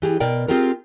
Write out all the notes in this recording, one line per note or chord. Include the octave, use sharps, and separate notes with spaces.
E3 G4 G#4
B2 A#4 D5 G5
C4 F4 G4 G#4 A#4